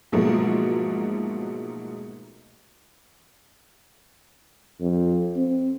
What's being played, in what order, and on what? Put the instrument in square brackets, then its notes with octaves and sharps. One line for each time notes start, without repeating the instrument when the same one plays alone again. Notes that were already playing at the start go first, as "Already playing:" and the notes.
[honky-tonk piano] G#2 B2 F3 F#3 A3 A#3
[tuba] F2
C4